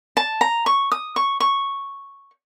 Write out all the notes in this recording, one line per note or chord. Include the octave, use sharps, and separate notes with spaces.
A5
A#5
C#6
D#6
C#6
C#6